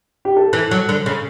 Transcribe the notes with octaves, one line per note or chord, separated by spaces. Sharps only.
G4
A4
E3
F#3
D3
C#3